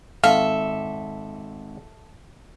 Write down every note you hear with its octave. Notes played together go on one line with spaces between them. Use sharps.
G#1 A4 E5 F5